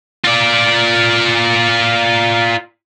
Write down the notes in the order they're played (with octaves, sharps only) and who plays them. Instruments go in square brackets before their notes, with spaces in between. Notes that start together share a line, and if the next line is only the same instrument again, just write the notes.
[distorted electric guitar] F4 D5